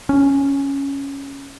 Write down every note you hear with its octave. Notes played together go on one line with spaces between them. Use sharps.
C#4